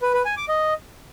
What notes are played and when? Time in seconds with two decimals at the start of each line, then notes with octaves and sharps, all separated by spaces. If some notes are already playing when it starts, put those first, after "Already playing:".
0.02 B4
0.14 B4
0.25 G#5
0.37 D6
0.49 D#5